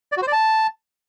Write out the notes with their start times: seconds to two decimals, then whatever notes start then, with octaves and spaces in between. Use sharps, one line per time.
0.12 D5
0.17 F#4
0.22 C5
0.27 D5
0.32 A5